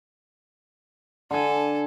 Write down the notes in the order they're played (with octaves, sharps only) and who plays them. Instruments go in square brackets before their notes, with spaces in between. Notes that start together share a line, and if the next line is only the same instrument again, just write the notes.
[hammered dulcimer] D3 G#5 [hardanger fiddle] A4